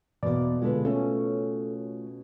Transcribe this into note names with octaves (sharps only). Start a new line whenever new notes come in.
E2 B2 A#3 D5
A#2 D3 G#3 F4 A4 B4
A3 C#4 F4 A4 G#5